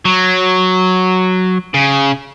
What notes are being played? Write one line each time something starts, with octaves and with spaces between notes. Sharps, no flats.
F#3
C#3